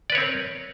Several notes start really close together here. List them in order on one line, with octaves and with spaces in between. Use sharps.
D5 B4 C#5 C4 A#4